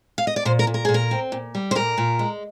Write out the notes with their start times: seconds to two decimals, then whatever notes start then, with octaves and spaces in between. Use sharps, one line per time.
0.18 F5
0.27 D#5
0.36 D5
0.45 A#2 C5
0.59 A#4
0.67 A#2
0.74 A#4
0.85 A#2 G#4
0.94 A#4
1.11 C4
1.32 A#2
1.55 G3
1.71 C5
1.75 A#2 A#4
1.98 A#2
2.19 G#3